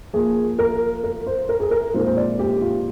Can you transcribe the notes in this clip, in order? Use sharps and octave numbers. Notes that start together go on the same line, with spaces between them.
F3 A#3 F4 G#4
A#4
A#4
C5
A#4
G#4
A#4
A#2 F3 G#3 C4 D#4 C5
C5
D5
G4
F4